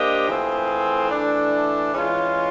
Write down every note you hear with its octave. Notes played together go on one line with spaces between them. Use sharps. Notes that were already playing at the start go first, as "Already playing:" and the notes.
Already playing: A#3 D4 G4 C5 D#5
E3 A3 C4 F4 G#4
E3 A3 D4
E3 G#3 C#4 F4